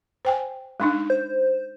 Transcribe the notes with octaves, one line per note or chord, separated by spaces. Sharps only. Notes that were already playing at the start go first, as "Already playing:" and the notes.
C5 G5 G#5
G#3 D4 D#4
C5